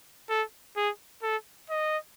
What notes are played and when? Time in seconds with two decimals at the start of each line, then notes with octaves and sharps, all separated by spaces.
0.29 A4
0.76 G#4
1.22 A4
1.70 D#5